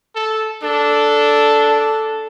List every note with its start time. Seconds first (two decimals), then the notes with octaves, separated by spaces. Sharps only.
0.15 A4
0.63 D4 A4